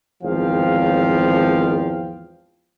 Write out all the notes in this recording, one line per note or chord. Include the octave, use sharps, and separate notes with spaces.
G#1 E2 F3 F5 G5